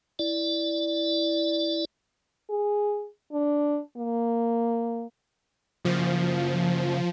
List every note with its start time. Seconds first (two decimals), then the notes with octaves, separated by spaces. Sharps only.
0.19 E4 D5
2.50 G#4
3.32 D4
3.97 A#3
5.85 C#3 F3 A#3